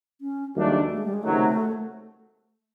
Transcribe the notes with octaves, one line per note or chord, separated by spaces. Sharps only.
C#4
D#2 C#3 F#3 G3 A3 D4
A3
G#3
G3
G#3
C#2 C3 D#3 F#3 A3